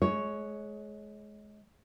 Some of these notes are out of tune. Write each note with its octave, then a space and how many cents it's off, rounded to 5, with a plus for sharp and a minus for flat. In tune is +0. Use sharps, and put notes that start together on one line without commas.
G#3 +25 C#5 +0